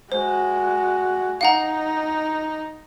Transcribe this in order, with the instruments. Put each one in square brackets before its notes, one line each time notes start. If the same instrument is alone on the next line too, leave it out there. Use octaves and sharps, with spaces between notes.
[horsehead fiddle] G#3 F#4 [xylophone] C5
[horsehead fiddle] D#4 [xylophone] F5 F#5 A#5